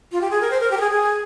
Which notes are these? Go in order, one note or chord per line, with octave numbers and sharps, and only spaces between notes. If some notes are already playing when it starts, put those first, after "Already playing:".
F4
G4
G#4
A#4
C5
A#4
G4
A#4
G#4
G#4